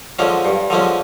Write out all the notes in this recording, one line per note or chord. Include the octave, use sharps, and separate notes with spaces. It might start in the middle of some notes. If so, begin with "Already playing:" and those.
D3 F3 G#3 C#4
G2
D3 F3 G#3 C#4